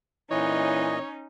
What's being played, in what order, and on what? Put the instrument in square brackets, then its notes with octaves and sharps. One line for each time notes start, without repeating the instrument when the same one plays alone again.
[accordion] A#2 D#5 [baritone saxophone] E3 [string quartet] C#4 D#4 [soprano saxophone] C#5